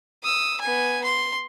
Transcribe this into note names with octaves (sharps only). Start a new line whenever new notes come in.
D#6 E6
B3 G#5
C6